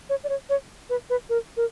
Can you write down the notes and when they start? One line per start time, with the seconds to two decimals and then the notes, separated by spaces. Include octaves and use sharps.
0.09 C#5
0.24 D5
0.29 C#5
0.49 C#5
0.89 B4
1.10 B4
1.29 A#4
1.57 A#4